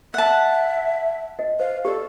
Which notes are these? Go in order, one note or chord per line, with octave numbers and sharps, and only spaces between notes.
E5 F#5 A5
D#5
C5 F5
G4 A4 D5